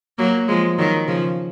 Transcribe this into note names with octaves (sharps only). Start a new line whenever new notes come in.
F#3 A#3
F3 G#3
D#3 F#3
C#3 F3